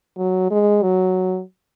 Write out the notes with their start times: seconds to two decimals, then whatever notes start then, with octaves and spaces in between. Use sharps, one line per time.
0.17 F#3
0.51 G#3
0.83 F#3